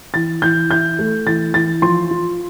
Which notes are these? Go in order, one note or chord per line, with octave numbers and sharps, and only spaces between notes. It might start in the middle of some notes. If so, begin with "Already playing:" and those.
E3 A6
E3 G6
E4 G6
A3
E3 A6
E3 A6
F3 C6
F4